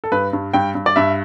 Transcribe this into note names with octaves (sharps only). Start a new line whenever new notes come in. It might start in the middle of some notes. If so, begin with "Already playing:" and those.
A4
G2 B4
G2
G2 G5
G2
D5
G2 E5